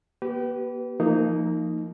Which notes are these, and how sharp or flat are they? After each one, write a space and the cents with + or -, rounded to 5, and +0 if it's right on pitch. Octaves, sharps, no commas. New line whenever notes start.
A#3 +45 G4 -30 B4 +0
F3 -30 A#3 -20 D#4 +0